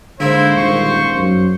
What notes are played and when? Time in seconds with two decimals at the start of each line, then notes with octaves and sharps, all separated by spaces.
0.20 G#2 D3 A#3 E4 C5
0.57 D#1 C#6
1.16 F#2